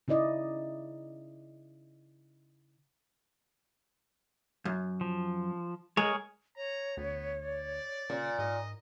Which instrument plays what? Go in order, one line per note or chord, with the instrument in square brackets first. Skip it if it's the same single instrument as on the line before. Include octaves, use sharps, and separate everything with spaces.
[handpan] C#3 D#4 E4 D5 D#5
[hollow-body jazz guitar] F#2
[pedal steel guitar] F3
[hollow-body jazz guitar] G#3 [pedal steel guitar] G#4 A#4 C#5
[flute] C#5 [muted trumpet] A#5
[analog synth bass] D2 [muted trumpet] B3
[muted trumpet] D5
[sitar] A#2 [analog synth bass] C#3
[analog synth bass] G#2 [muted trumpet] D#5